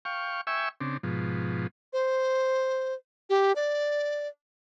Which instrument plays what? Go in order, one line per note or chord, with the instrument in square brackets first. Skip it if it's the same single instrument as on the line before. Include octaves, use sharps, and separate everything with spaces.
[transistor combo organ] F5 G5 C#6
E5 G5 G#5 C#6 E6
C#3 C4 D4
G#2 B2 F3
[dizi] C5
G4
D5